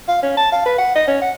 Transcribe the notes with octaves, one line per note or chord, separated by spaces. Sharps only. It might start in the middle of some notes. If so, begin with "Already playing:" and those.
F5
C#4
A5
F5
B4
F#5
D#5
C#4
F#5